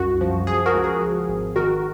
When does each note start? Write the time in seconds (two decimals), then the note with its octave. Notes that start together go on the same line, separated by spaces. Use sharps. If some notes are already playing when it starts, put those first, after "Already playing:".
Already playing: C2 F#2 F#4
0.21 F3
0.47 F3 G#4
0.66 F#4 A#4
0.74 C#2
0.84 G#4
1.02 F3
1.29 G#1
1.56 D#3 F#4 A#4